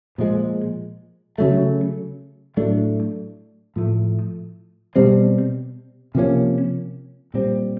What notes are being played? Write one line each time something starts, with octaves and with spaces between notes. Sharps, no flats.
A#2 F3 G#3
C#3 F#3 A3
A2 F#3 A3 D4
A2 F3 A3
B2 G3 C4
C3 F3 A#3 C#4
A#2 G3 C4